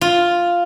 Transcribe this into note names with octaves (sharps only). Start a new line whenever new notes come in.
F4